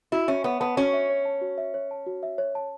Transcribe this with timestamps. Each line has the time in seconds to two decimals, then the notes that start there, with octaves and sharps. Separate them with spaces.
0.12 E4 F#4
0.28 C#4 E5
0.44 B3 C#5
0.60 B3 A5
0.77 C#4 F#4
0.93 E5
1.10 C#5
1.25 A5
1.42 F#4
1.58 E5
1.74 C#5
1.91 A5
2.06 F#4
2.23 E5
2.38 C#5
2.55 A5